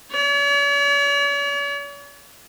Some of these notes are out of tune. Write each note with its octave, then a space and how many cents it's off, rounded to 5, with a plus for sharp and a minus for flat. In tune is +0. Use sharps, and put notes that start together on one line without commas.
C#5 +45